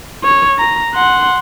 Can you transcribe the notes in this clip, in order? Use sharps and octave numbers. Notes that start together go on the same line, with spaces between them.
C#5
A#5
F#5 C6